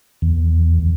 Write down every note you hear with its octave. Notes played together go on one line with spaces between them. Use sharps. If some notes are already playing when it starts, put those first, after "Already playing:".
E2